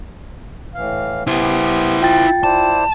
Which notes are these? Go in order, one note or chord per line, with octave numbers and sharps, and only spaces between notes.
A2 E3 F5
B3 E4 G4 C5
F4 G5 A6
E4 C5 D5 A5